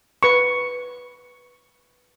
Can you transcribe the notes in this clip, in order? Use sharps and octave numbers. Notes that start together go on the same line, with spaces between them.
B4 C#6